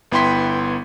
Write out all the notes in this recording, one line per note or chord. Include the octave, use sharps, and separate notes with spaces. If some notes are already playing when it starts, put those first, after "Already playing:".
G1 B3 E4 G5 C6 B6